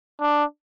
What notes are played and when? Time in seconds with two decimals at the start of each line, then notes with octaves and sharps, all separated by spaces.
0.21 D4